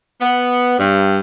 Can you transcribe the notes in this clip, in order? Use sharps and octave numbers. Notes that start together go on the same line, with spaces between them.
B3
G2